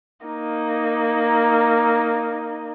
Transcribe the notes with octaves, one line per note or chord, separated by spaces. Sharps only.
A#3 D#4